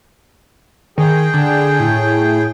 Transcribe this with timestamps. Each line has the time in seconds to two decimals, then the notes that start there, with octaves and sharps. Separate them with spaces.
0.98 D#3 G#4 G5
1.34 D3
1.79 A2